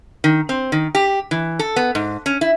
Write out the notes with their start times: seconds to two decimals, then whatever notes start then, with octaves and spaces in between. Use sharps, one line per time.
0.24 D#3
0.49 C4
0.72 D#3
0.95 G4
1.31 E3
1.59 A4
1.76 B3
1.95 G#2
2.26 C#4
2.41 E4